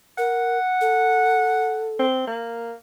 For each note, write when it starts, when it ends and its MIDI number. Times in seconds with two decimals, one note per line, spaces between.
0.18 0.58 70
0.18 1.90 78
0.81 2.05 69
1.99 2.24 60
2.27 2.73 58